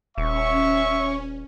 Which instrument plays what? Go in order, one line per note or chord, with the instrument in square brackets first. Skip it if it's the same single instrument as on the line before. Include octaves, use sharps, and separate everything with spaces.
[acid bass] D#1 [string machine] C#4 [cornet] E5 [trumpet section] C#6